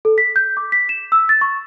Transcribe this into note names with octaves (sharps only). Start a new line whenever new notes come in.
A4
B6
G6
D6
B6
E7
E6
A6
C#6